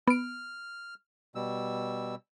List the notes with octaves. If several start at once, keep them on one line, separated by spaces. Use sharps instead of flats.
B3 F6 D7
B2 G3 E6